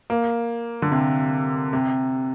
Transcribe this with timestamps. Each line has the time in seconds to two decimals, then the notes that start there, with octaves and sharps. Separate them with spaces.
0.10 A#3
0.82 D3
0.92 C3
1.73 C3